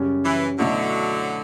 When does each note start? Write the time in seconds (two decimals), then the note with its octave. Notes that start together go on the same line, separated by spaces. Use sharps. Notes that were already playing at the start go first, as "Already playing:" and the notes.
Already playing: F#2 C#3 G3 C#4
0.24 E3
0.58 B2 D3 F#3 A3 E4